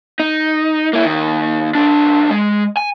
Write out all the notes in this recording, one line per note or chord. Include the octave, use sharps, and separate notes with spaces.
D#4
A#3 E4
D#2 D#3
B1 D4
G#3
G#5